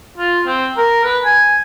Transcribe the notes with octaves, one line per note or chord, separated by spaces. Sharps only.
F4
C4
A#4
B4
G#5